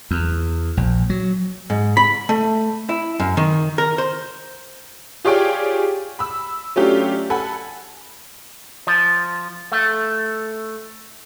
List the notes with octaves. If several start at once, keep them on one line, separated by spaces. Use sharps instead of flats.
E2
A#1
F#3
G#2
B5
A3
E4
F#2
D#3
A#4
C5
F4 G4 G#4 C#5 D5 G5
B5 E6
F#3 A3 C#4 D4 F4 G4
A4 F#5 G#5 B5
F3
A3